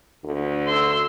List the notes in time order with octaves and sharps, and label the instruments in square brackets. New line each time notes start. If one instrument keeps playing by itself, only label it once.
[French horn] D2
[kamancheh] C6 E6